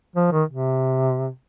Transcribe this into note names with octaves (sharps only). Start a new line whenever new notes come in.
F3
D#3
C3